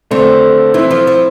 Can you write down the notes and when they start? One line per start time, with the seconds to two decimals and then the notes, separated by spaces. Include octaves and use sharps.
0.11 D3 A3 C4
0.74 E3 C4 E4
0.91 F3
1.07 F3